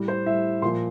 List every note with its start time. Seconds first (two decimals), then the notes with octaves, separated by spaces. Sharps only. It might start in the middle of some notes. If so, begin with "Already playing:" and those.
Already playing: A2 G3
0.08 C5
0.26 A2 G3 E5
0.62 A#2 C6
0.65 F3